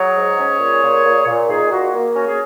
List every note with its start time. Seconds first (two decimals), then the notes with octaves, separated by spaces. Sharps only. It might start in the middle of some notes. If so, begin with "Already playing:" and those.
Already playing: F#3 G#4 C#5
0.14 G#2
0.37 C#4
0.59 A#2
0.81 A#2
1.04 A#2
1.26 A#2
1.49 A#2 D#4 G#4
1.71 A#2 F#4
1.94 A#3
2.15 C#4 F#4
2.27 G#4